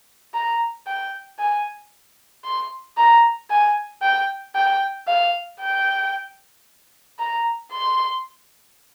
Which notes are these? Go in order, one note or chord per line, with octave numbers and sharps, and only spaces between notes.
A#5
G5
G#5
C6
A#5
G#5
G5
G5
F5
G5
A#5
C6